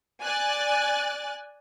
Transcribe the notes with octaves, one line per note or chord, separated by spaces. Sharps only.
D5 G#5 F#6 A6